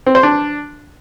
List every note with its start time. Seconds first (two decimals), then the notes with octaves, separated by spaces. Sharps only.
0.06 C4
0.15 C5
0.23 D4